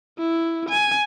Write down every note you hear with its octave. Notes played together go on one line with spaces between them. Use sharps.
E4
G#5